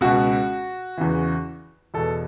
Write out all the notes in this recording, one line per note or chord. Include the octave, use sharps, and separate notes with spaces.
C#2 B2 F#4
E2 C#3 E3
E2 B2 A4